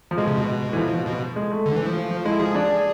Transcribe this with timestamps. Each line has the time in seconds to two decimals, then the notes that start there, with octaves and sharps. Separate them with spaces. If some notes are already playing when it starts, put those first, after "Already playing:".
0.11 F3
0.17 B2 G#3
0.27 C3
0.38 B2
0.73 E3
0.77 F3
1.07 B2
1.36 G#3
1.52 A3
1.66 D3
1.76 E3
1.86 F3
2.25 G#3 E4
2.39 F3 G#4
2.55 D4